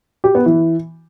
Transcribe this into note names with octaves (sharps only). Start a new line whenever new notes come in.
G4
B3
E3